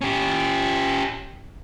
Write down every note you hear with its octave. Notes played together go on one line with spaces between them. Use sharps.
C#4 G4